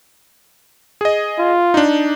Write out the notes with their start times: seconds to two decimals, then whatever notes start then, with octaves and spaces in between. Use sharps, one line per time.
1.01 G#4 D#5
1.39 F4
1.74 D4 D#4